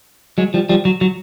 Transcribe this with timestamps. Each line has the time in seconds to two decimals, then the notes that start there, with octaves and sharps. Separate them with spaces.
0.38 F#3 G#3
0.54 F3 G3
0.69 F3 G3
0.85 F#3
1.01 F#3